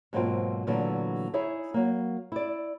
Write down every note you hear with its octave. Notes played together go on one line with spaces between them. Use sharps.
G#2 B2 F#3 A#3 C4 F4
A#2 D3 E3 F#3 A3 B3
D#4 E4 G#4 C#5 E5
F#3 A#3
E4 D5